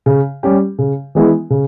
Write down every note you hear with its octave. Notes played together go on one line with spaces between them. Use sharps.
C#3
G3 C#4 G4
C#3
E3 G#3 B3 E4
C#3